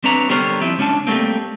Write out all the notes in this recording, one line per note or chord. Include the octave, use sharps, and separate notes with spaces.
C4 D4 B4 C#5 A#5
D3 G3 B3 A#4 C5 C#5
F3 C4 E4
C#2 F#3 C#4 D4 A5
G3 A3 A#3 C4